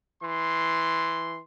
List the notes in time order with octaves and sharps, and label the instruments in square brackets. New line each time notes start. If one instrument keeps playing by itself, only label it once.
[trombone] E3 [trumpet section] C6